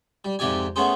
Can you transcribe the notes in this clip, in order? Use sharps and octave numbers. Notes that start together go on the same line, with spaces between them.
G3
F2 G#2 C3 G4 D5 G#5
A3 B3 C#4 G#4 C5